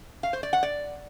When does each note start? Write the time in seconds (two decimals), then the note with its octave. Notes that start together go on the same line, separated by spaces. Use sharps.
0.23 F5
0.33 C5
0.43 D5
0.53 F#5
0.63 D5